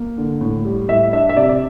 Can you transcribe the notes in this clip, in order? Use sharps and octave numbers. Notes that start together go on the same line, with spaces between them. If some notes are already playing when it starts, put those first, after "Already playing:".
Already playing: A#3
D3
A2
G3
A2 E5
D4 E5
E5
C3 D5
D5